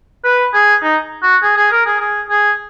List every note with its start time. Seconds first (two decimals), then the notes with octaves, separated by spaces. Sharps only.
0.24 B4
0.54 G#4
0.82 D#4
1.23 F#4
1.42 G#4
1.57 G#4
1.71 A#4
1.86 G#4
2.00 G#4
2.30 G#4